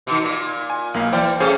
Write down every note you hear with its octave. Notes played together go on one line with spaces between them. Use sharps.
B2 D#3
A#2
G#5
B1 A#3 F5
E3 C5 D5 G5
A3 A#3 C#4 G#4 A4 C5